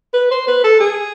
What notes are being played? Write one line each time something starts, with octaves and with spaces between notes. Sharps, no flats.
B4
C5
B4
A4
G#4